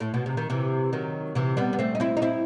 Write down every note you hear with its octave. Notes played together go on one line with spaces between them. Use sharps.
A2
B2
C3
D#3
C3 E3
D#3 F#3
C3 E3
G3 B3
B3
A3 C4
D#4
C4 E4
D#4
C4 E4